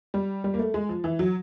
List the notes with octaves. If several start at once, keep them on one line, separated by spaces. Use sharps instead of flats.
G3
G3
A#3
A3
G#3
F3
E3
F#3